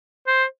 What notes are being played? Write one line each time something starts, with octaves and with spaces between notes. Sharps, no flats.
C5